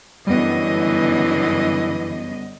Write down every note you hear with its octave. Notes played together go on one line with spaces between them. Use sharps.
F#2 D3 E3 G3 B3 D#5